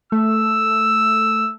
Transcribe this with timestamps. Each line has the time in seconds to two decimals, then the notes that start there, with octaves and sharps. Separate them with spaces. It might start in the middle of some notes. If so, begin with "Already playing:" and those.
0.12 A3 E6